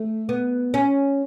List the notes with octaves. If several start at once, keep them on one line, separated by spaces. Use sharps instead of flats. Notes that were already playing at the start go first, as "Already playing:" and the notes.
Already playing: A3
B3
C#4